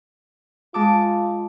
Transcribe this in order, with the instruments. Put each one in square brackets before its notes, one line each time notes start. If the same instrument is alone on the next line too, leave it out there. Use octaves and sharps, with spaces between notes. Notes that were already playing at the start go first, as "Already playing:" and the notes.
[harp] G#3 A5 D6 [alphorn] F4